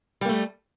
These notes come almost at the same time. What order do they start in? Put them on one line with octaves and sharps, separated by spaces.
G3 A#3 A3